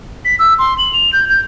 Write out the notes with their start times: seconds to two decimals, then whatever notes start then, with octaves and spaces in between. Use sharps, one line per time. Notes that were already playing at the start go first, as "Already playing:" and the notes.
0.25 B6
0.39 E6
0.59 C6
0.78 F#7
0.93 F7
1.13 G6
1.30 G6